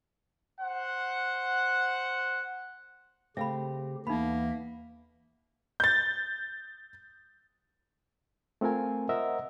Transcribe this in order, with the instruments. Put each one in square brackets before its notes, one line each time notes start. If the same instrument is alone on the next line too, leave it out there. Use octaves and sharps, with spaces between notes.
[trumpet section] C5 F#5
[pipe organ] C#3 G4 [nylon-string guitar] A3 C4 [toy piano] E5 F5 B5
[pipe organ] D#2 E3 E5 [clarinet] A#3 [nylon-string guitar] B3 [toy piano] D#4 B5
[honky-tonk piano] G6 A6
[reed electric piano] A3 C4 F4 A#4 G#5
A#4 C5 D#5 E5 F#5 A#5